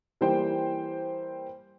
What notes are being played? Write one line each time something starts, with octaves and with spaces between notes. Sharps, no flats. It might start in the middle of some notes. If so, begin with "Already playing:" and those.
E3 G3 A#3 C5 G5